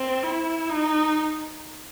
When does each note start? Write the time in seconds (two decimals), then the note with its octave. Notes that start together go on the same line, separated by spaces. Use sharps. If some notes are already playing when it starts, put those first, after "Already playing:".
Already playing: C4
0.23 E4
0.69 D#4